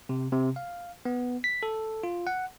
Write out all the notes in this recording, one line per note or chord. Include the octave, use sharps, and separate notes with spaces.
C3
C3
F5
B3
B6
A4
F4
F#5